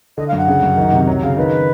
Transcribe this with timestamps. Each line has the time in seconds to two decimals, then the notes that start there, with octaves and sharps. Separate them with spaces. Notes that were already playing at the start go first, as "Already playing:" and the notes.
0.17 D3 D#5
0.28 F5
0.32 F#2 F#5
0.48 C#3
0.63 F#2
0.77 D#3
0.93 C3
1.07 F#3
1.22 C#3 F5
1.37 D#3 B4